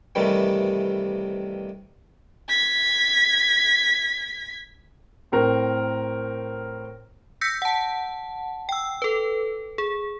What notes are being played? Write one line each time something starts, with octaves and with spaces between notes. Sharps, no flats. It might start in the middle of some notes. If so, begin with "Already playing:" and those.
G2 C3 D#3 E3 G3 A3
G#6 B6
A2 C4 A#4
E6 G6 A#6 B6 C#7
F#5 A5
G5 E6
A4 B4
G#4